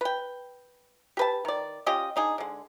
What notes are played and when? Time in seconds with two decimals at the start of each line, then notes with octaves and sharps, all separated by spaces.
0.01 B4 G5
1.17 G4 B4 A5
1.45 D#3 D5
1.86 C#4 F4 G4 D#5
2.16 D4 D#4 G#4
2.38 D3 G#3